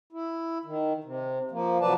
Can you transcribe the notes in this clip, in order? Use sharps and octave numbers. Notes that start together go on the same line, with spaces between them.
E4
D#3
C3
F3 A#3
C3 F3 F#3 B4 D5 A5